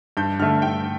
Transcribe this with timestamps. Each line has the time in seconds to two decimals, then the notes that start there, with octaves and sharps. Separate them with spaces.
0.17 G2 G6
0.39 D3 A3 F6
0.62 G2 G5